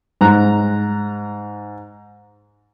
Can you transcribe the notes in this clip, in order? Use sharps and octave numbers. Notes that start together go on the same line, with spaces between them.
G#2 A#5 F#6